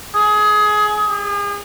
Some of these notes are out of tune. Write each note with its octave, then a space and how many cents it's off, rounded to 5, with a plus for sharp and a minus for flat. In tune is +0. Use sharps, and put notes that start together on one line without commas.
G#4 +20
G#4 -40